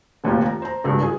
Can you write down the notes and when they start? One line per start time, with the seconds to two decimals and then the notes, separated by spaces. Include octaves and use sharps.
0.24 F1 D#2 A#2 F4 G4
0.46 A#5
0.62 C5 A#5
0.84 G#1 C#2 G2
1.02 G#4